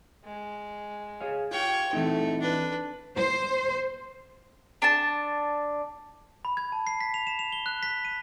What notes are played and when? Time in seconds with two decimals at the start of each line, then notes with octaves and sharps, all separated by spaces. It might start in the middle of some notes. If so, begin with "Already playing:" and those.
0.25 G#3
1.21 G#4 C#5 F5
1.51 F4 G4 C#5 G5
1.93 E3 A3 C4 D#4
2.41 D4 B4
3.17 C5
4.82 D4 A5
6.45 B5
6.57 G#6
6.72 A5
6.87 C7
7.01 B6
7.14 F7
7.27 E7
7.39 F7
7.52 G7
7.66 F#6
7.83 B6
8.05 D#7